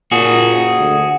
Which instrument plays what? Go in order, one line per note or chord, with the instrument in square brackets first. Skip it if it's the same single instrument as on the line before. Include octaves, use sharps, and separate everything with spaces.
[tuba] A#2 [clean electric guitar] F#4 G#4
[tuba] D2